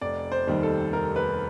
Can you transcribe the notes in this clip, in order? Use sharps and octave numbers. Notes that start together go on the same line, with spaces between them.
F1 D5
C5
D#2 D#3 G3
A4
F1 A#4
B4